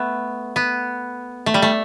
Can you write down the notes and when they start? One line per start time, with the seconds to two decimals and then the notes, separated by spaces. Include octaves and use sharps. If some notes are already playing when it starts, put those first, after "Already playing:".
Already playing: A3 B3
0.56 B3
1.46 A3
1.54 G3
1.62 A3